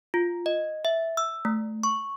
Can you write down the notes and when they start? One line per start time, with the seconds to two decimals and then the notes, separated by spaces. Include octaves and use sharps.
0.14 F4
0.46 D#5
0.85 E5
1.17 E6
1.45 A3
1.83 C#6